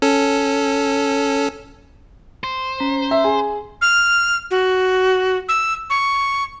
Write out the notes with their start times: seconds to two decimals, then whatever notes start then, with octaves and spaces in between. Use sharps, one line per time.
0.02 C#4 A4
2.44 C5
2.80 C#4 A#5 B6
3.11 E5
3.24 G#4
3.82 F6
4.51 F#4
5.49 E6
5.90 C#6